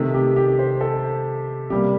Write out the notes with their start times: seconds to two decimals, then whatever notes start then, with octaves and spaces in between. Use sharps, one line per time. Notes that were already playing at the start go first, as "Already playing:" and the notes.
Already playing: C3 D#3 A3
0.14 G4
0.36 G4
0.59 C5
0.81 A4
1.70 C3 G3 A#3 G4